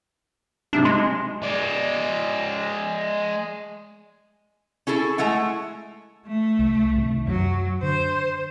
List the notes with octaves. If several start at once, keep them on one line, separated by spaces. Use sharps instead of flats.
G#2 C3 F#3 D4
G#3 C6
G#3 D5
C#4 E4 G#4 A4
G#3 A3 E4 F#5
A3
C2
C2 C3 D#3
F#2 F#3
D3 C5